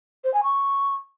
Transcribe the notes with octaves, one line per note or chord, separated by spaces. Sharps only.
C5
G#5
C#6